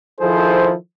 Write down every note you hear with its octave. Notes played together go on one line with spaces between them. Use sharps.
D#3 F3 E4 G#4 A4 C5